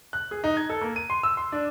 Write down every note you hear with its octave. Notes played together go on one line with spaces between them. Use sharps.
F#6
G#4
D#4
G#6
A4
A#3
D#7
C6
E6
C6
D4